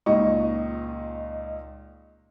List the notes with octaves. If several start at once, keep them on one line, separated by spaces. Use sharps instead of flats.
C#2 A#2 D#4 D#5 C#6